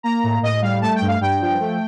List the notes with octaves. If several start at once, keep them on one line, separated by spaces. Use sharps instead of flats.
A#3 A#5
A2
A2 D#5
G3 F5
A3 A5
G5
G2
F5
G2 G5
F3
A3